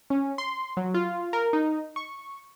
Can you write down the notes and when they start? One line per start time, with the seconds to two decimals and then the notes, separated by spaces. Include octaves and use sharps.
0.10 C#4
0.38 C6
0.77 F#3
0.94 F4
1.33 A#4
1.53 D#4
1.96 C#6